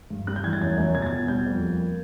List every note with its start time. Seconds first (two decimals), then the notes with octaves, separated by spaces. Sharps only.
0.10 G2
0.27 G3 F#6
0.36 G6
0.44 E2 G#6
0.53 A6
0.61 F#2 G#6
0.78 F#2
0.95 B2 G#6
1.02 A6
1.06 G#6
1.12 B2
1.28 G3 G6
1.46 F2
1.62 A#3